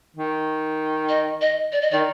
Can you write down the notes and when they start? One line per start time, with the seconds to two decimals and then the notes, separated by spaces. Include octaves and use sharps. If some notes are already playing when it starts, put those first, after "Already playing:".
0.16 D#3
1.09 D#5
1.41 D#5
1.72 D5
1.82 D#5
1.91 D#3 D5